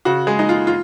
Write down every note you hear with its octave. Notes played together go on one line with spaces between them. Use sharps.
C#3 F#4
G#3 G#4
G#3 D#4
F4
F4